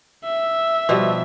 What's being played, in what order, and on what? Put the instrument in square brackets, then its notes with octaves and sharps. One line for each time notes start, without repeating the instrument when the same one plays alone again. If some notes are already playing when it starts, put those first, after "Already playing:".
[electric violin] E5
[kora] B2 F3 G3